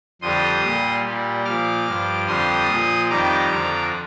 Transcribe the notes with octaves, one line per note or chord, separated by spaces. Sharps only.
F2 D3 G3 C6 D#6
A#2 G3
A#2 G3
A#2 F3 D6 F6
G2 F3
F2 D3 G3 C6 D#6
A#2 F3
F2 D#3 G3 A#5 D6
F2 D3 F3